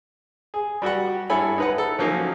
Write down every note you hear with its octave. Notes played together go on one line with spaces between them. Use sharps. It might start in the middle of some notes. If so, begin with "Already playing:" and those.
G#4
G3 F#4 G4 F#5
G2 E4 A4 C#5 G#5 B5
D#4 B4 F#5
A4
F3 F#3 A#3 C#4 D#4